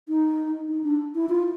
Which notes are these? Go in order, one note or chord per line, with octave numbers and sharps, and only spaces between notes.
D#4
D#4
D4
E4
F4